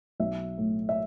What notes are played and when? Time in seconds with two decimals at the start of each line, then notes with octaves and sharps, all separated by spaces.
0.20 B1 E5
0.58 A2
0.89 E5